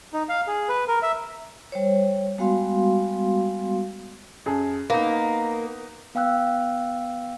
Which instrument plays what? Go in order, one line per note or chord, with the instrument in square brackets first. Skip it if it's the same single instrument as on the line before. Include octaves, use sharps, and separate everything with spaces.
[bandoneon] D#4
F5
G#4
B4
A#4
E5
[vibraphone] G3 C5 C#5
G3 G#3 B3 F#4 F5 C6
[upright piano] F#2 G#4 A5
[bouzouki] A#3 [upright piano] B3 D#4
[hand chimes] B3 F5 G5 E6 F#6